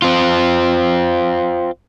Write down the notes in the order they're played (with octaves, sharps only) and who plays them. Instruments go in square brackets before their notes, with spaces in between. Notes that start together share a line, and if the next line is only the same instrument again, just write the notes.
[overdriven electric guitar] C4 F4